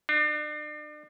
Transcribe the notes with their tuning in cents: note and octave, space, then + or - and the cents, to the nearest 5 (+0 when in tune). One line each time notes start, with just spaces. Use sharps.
D4 +40